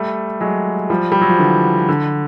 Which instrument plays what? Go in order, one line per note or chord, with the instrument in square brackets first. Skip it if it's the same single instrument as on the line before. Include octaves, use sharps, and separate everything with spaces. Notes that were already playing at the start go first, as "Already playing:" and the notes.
Already playing: [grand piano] G3 A3
F#3 G#3
F3 G3
G3
F#3
F3
D3 E3
D3